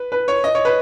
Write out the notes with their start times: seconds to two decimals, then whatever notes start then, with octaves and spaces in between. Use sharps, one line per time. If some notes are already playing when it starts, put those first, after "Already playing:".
Already playing: B4
0.12 B4
0.28 C#5
0.44 D#5
0.55 C#5
0.65 B4